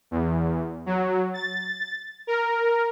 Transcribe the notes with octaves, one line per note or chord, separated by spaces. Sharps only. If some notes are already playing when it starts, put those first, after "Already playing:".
E2
F#3
A6
A#4